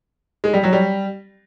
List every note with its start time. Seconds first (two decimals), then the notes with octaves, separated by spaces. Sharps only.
0.44 G#3
0.53 G3
0.64 F#3
0.73 G3